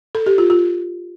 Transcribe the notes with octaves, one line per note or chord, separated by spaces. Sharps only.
A4
G4
F4
F4